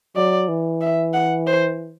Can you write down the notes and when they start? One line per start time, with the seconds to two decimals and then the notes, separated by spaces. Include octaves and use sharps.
0.16 F#3 D5
0.48 E3
0.81 E5
1.14 F#5
1.47 C5